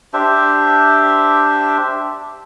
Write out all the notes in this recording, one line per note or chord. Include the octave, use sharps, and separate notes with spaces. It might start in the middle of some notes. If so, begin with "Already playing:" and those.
D4 G4 C5 E5